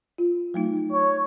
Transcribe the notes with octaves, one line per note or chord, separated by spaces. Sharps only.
F4
F#3 A3 D#4
C#5